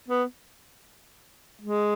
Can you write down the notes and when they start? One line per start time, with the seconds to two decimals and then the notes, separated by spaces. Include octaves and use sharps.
0.08 B3
1.61 G#3